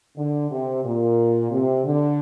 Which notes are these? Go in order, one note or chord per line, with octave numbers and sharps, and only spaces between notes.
D3
C3
A#2
C3
D3